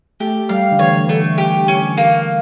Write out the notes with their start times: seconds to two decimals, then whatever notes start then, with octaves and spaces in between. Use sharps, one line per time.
0.20 A3 G4
0.49 G3 F5
0.72 D3
0.79 E3 C#5
1.09 D3 A3
1.38 G4
1.68 C#4
1.97 A#3